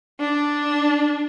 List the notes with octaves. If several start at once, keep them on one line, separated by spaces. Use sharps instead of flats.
D4